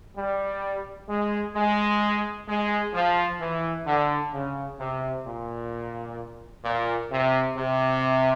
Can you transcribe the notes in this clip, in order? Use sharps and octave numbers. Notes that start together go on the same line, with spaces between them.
G3
G#3
G#3
G#3
F3
E3
D3
C#3
C3
A#2
A#2
C3
C3